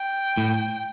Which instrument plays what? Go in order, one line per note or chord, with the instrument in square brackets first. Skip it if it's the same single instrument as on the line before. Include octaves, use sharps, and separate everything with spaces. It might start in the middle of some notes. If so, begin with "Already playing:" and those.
Already playing: [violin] G5
[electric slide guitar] A2